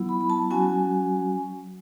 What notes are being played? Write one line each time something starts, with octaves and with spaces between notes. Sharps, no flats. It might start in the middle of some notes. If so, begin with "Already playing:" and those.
Already playing: F#3 B3 E4
B5
B5
A5
F#3 C#4 F#4 G#5